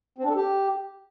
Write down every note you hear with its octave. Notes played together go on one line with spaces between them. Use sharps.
C4
D4
A4
G4